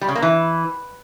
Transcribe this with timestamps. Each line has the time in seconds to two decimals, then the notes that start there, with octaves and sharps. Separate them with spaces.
0.01 G3
0.08 C#3
0.15 A#3
0.22 E3